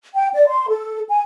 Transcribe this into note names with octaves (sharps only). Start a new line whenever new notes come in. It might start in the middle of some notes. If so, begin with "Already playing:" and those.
G5
D5
C6
A4
G#5